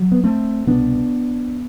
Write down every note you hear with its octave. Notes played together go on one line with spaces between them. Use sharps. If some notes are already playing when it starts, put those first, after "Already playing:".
Already playing: F#3
B3
A3 C4
C2 B2 B3 D4